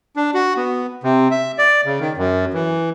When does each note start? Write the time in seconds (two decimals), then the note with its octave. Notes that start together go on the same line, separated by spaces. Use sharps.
0.16 D4
0.34 F#4
0.57 B3
1.03 C3
1.31 E5
1.58 D5
1.86 C#3
2.00 D#3
2.17 F#2
2.53 E3